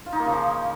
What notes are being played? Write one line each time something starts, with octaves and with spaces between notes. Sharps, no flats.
F4
D#4
A#3
C#3
F3